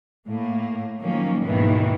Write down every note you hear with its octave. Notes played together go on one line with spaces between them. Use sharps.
A2 A#3
D#3 F3 F#3 A#3 C#4
D#2 G#2 B2 D#3 E3